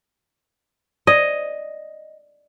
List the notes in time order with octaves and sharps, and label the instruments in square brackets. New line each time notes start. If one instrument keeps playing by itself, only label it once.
[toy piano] D5 [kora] D#5